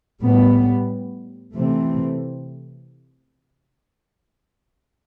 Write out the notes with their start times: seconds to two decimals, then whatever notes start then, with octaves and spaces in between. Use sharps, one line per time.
0.20 A2 G3 B3
1.55 C3 E3 A3 C4